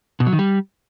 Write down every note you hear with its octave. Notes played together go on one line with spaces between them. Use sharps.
B2
F#3
D#3
G3